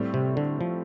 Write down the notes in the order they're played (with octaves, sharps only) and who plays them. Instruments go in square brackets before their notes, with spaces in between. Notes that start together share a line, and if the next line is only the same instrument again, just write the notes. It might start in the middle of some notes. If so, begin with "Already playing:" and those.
Already playing: [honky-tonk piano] A2 G3 C4
[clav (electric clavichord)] C3
D3
F3